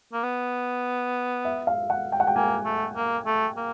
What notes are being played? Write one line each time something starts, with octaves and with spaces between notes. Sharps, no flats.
A#3
B3
E5
F5
F#5
G5
F#5
G5
A#3 G#5
A3
A#3
A3
A#3